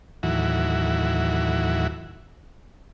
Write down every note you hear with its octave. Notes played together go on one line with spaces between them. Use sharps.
D#2 A2 E3 F#3 E4 F#4